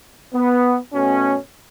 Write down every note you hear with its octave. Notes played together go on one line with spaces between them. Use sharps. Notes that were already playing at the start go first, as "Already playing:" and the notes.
B3
B2 A3 C#4